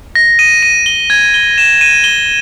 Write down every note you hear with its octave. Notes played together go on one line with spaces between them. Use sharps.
A#6
D#7
D#7
G7
G#6
G7
E7
D#7
G7